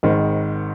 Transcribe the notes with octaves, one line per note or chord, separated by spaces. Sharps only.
G#1 G#2 D#3